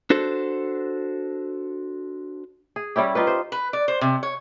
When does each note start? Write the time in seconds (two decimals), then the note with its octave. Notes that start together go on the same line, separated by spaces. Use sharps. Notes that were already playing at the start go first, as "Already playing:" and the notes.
0.10 D4 F#4 A4 C5
2.76 G#4
2.96 G3 C#4 E4 G4
3.15 D#4 F4 G4 B4
3.27 C5
3.52 B4
3.73 D5
3.88 C5
4.01 C3
4.23 C#5